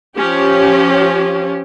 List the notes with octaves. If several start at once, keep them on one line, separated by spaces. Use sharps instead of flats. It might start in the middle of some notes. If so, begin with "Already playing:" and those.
F3 C#4 G4